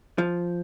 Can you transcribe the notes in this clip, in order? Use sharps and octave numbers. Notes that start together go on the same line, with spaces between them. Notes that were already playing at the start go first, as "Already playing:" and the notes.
F3